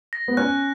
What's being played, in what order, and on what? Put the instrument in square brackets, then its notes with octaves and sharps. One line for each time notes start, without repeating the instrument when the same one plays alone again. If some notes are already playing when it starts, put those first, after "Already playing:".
[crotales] A#6
[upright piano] B3
[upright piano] C#4 [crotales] F#6